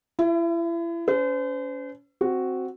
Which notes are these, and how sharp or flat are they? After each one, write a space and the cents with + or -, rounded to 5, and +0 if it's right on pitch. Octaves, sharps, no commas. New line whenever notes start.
E4 +35 E5 +0
C#4 +35 C5 -40
C4 +0 F#4 +0